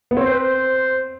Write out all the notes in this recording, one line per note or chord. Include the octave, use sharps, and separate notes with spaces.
B3
C4 C#5
C5
B4
C5